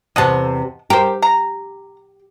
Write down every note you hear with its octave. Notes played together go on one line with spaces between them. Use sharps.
E2 C3 D#5 F#5 A5
G4 A#4 C5
A#5